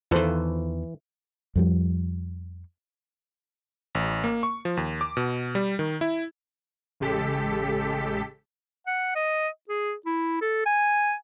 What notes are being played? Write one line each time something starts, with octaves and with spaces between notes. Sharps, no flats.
E2 D#3 E3 F4 A4 C5
F2 F3 G3
A1
A#3
C#6
F3
D#2
D6
B2
G3
D#3
E4
A1 C#3 G#3 G4 A4 B6
F#5
D#5
G#4
E4
A4
G#5